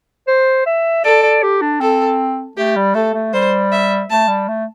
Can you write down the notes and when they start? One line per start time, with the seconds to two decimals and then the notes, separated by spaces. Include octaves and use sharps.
0.27 C5
0.66 E5
1.04 A4 D5
1.23 D5
1.42 G4
1.61 D4
1.80 C4 A4
2.57 A3 G4
2.76 G3
2.94 A3 A4
3.14 A3
3.33 G3 C5
3.72 E5
4.09 A3 A5
4.28 G3
4.48 A3